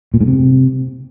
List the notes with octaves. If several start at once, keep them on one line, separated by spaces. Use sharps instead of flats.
A#2
G#2
C3